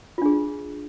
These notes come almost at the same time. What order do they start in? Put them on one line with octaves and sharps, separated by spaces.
F4 D4 G#4